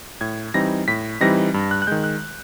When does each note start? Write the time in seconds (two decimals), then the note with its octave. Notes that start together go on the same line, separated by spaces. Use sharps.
0.21 A2 G#6
0.54 E3 G3 C4 D#4 A#6
0.88 A2 B6
1.21 E3 G3 C4 D#4 A#6
1.54 G2
1.71 F#6
1.82 F#6
1.87 D#3 G#3 G6
2.04 F#6